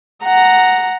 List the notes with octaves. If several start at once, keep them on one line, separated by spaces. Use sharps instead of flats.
F#5 A#5